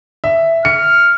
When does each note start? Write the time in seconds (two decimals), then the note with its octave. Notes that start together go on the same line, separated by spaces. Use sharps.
0.24 E5
0.65 F6 C#7